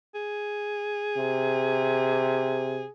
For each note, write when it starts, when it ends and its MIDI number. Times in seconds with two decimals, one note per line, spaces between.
0.15 2.89 68
1.17 2.85 48